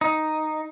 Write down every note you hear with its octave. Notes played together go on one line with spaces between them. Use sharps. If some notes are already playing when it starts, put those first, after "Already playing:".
D#4